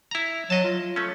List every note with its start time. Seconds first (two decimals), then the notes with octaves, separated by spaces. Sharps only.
0.11 E4 A#5
0.50 F#3 D#5 A5
0.64 F4
0.96 A3 C#4